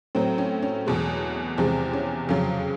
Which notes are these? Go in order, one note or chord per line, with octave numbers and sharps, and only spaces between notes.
A2 F#3 C4
C#4
C#4
E2 B2 G#3
E2 C3 F3 G#3 C4
C#4
F2 C#3 F#3